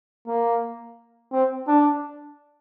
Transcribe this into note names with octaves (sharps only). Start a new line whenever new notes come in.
A#3
C4
D4